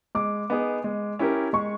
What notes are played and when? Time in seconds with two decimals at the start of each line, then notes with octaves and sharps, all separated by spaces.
0.15 G#3 D6
0.50 B3 D#4 G#4
0.84 G#3
1.19 C#4 E4 G4 A#4
1.53 G#3 C#6